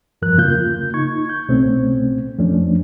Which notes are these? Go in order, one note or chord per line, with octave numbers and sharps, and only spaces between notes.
E2 G2 F3 A#4 F#6
C#3 A#3 F4 G6
D#4 C#6 G#6
G6
C2 B2 A3 C4 C#4
F2 F3 A3 C#4 D4